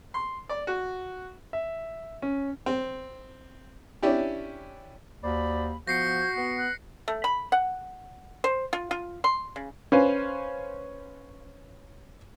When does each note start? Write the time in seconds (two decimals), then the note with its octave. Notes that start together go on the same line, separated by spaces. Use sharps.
0.14 C6
0.49 D5
0.67 F#4
1.53 E5
2.22 C#4
2.66 C4
4.03 C#4 D4 E4 G4
5.23 D#2 F#4 C5 D5 B5
5.87 F3 B3 F#4 G6 A#6 C7 C#7
6.36 B3
6.58 F#6
7.08 A3
7.24 B5
7.52 F#5
8.44 C5
8.73 F4
8.91 F4
9.24 C6
9.56 C#3
9.92 C#4 B4 C5 F5